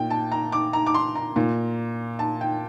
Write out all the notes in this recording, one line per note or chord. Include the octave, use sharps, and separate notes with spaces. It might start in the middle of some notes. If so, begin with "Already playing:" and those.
Already playing: A#2 G5
A5
A#5
D6
A#5
D6
C6
A#5
A#2
A5
G5